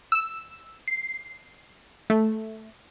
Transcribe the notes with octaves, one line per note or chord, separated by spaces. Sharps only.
E6
C7
A3